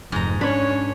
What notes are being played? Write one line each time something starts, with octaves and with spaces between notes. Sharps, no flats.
F1 G#2 A#5
C#4 D4 C#5 B5